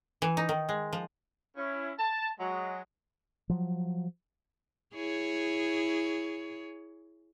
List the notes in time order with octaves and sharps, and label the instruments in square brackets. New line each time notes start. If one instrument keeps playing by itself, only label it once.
[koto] E3
D#4
D#3
G#3
F3
[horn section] C#4 E4
A5
F#3 G#3
[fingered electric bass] F3 F#3
[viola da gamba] E4 G#4 C#5